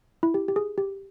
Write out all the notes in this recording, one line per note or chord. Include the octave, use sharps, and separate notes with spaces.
E4
G4
G4
G#4
G4